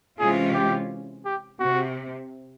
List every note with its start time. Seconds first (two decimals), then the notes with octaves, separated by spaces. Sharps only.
0.19 C3 E3 G#3 C#4 F4 G#4
0.54 G4
1.25 G4
1.60 C3 F#4